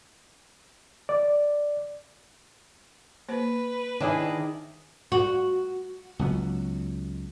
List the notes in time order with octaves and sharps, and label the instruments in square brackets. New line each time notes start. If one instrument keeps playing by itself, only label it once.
[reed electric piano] D5
[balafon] A#3 C5 [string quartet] B4
[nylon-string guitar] D#3 [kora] D4 E4 G#4 [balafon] C#5
[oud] F#4
[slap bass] C#2 F#3 B3